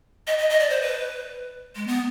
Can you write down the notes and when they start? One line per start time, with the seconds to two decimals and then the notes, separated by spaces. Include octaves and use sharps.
0.27 D#5
0.38 D#5
0.50 D#5
0.60 D5
0.70 C5
0.82 B4
1.76 G#3
1.87 B3